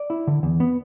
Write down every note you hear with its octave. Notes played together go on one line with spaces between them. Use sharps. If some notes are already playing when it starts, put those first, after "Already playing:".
Already playing: D5
E4
D3
E2
B3